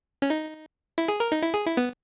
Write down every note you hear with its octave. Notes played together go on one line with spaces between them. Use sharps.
C#4
D#4
E4
G#4
A#4
D#4
E4
G#4
E4
B3